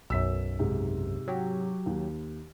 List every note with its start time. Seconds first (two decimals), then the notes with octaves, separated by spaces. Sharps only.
0.10 B1 F#2 E6 B6
0.59 G#2 C3
1.28 F#3 G4
1.86 D#2